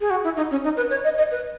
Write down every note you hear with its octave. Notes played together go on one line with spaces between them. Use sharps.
G#4
F#4
E4
D#4
C#4
D#4
B4
C#5
D#5
D#5
B4